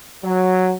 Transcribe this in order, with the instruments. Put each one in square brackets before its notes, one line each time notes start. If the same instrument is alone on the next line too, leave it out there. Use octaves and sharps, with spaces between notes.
[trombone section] F#3